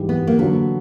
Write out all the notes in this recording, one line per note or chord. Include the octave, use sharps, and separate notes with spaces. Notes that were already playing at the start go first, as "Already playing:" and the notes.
Already playing: G#2 E3 G3
B3
A#3
D3 F#3 A#3 B3